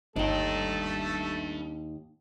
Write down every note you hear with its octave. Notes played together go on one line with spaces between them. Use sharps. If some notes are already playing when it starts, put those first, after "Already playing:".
G1 D#2 A3 D4 D#4 A4 G5